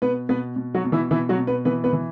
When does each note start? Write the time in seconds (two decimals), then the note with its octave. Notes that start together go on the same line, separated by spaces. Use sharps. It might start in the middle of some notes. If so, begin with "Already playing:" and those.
0.02 B2 B3 B4
0.29 B2 B3 B4
0.56 B2
0.74 F#3 F#4
0.84 B2
0.92 E3 E4
1.11 B2 E3 E4
1.29 F#3 F#4
1.38 B2
1.47 B3 B4
1.65 E3 B3 B4
1.84 B3 B4
1.93 E3